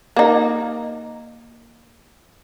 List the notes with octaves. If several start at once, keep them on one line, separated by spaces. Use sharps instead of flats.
A#3 D#4